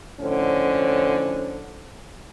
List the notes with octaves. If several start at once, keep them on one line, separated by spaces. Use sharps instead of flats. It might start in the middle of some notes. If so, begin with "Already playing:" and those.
F2 A2 D3 C#4 C5